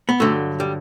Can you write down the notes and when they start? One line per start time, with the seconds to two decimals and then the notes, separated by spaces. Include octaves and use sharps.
0.09 B3
0.20 G2 D3 F#3 A3
0.60 G3